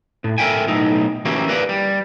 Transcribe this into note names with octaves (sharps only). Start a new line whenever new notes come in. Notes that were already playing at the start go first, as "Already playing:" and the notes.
A2
A4 A#4 C#5 E5 G5 G#5
B1 A2 D#4
E3 A#3 C#4 E4 F#4 G4
A#4 B4 D5 F5
G3